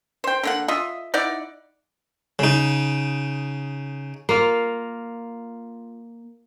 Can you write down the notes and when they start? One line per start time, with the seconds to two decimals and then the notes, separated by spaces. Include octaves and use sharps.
0.24 C5 G5
0.43 D3 A#3 F#5
0.68 F4 D#5 E5
1.14 D#4 E4 D5 F#5
2.39 C#3 D#4
4.29 A#3 F4